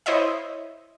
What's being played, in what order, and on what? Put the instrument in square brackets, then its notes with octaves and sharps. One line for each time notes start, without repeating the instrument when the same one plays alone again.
[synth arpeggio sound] E4 C5 C#5 D#5 E5